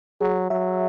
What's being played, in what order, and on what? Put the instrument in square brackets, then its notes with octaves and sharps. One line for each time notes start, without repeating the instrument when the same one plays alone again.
[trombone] F#3 [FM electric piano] G#4
[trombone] F#3 [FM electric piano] E5